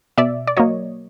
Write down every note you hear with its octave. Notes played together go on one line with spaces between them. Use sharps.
B2 D5 E5
D5
F#3 A#3 C#5 D#5